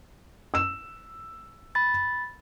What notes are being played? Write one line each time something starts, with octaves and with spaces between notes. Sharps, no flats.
E6 E7
B5 A6